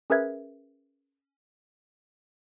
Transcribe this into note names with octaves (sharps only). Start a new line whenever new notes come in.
C#4 G#4 A#4 B4 E5 G#6